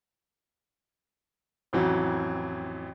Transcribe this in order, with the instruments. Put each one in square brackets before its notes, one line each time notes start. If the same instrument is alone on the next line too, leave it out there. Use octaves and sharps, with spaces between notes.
[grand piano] A1 F2 E3 F#3